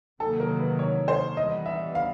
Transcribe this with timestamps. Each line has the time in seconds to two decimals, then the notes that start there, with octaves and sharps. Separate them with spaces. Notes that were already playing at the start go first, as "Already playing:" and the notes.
0.20 C3 D#3 F#3 A#3 A4
0.40 A#4
0.59 B4
0.79 C#5
1.08 C5
1.37 E3 G3 B3 D#5
1.66 E5
1.95 F5